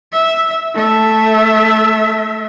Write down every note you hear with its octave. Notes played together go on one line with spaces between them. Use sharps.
E5
A3 E5